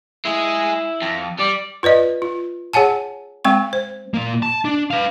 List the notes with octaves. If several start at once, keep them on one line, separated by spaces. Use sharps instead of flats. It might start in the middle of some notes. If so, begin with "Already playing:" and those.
G#3 E4 G#4
F2
G3 D5
F4 B4 D5 D#5
F4
G#4 C#5 F#5 G#5 A5
G#3 C4 G5 C#6
C5
A#2 A#3
A5
D4
B4 F5